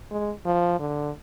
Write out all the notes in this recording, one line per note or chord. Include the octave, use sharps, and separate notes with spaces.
G#3
F3
D3